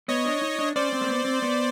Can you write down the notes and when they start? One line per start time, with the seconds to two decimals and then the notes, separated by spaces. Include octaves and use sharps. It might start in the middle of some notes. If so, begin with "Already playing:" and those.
0.08 B3 C#5 D#5
0.25 D4
0.42 D#4
0.59 D4
0.76 C#4 C5 D5
0.93 C4
1.01 A#3
1.09 B3
1.25 C4
1.42 B3